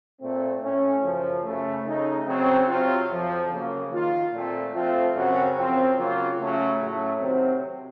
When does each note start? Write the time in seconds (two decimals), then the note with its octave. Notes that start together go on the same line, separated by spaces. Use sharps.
0.20 A#2 A3 C4
0.61 A2 A3 C#4
1.02 F#2 C#3 F3
1.44 F#2 C#3 A3
1.85 C#3 A3 D#4
2.26 C#3 F#3 C4
2.68 C3 F#3 C4 F4
3.09 F2 C3 F3
3.50 C#3 F#3 A#3
3.91 D#3 A#3 F4
4.32 A#2 A3 C4
4.73 F3 A3 C4 F4
5.14 F#2 C#3 F#3 C4 F#4
5.55 F#2 F3 C4 F4
5.97 C#3 F#3 A#3 F4
6.38 C#3 F#3 A3 C#4
6.79 A2 F#3 A3 C#4
7.20 C3 D#3 F#3 C4